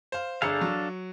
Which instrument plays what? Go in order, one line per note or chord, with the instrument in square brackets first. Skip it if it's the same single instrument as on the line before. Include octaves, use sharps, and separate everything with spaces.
[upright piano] C5 F5
[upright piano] G1 G#4 C#7 [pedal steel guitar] D4 A4 F5
[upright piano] F#3